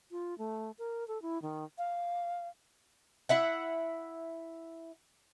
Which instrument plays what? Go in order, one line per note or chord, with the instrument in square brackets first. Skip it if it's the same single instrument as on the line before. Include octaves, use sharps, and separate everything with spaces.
[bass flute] F4
A3
A#4
A4
E4
D#3
F5
[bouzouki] E4 E5 F#5